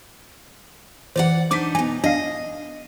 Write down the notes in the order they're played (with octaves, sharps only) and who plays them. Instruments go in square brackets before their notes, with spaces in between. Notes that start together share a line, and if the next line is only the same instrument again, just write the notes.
[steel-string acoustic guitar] E3 D5 F#5 [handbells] C5
[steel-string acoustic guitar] D4 D#4 C5 [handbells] D6 B6
[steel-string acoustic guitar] B2 D#4 [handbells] G#5
[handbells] D4 F5 [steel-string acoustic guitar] D#5